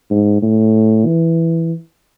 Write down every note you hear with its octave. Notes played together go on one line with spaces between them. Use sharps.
G#2
A2
E3